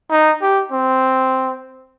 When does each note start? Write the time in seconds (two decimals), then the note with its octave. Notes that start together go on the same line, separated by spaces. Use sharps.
0.11 D#4
0.42 G4
0.71 C4